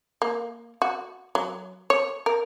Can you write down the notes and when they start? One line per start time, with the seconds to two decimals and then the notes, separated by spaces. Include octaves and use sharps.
0.22 A#3
0.82 F#4
1.35 F#3
1.90 C#5
2.26 A#4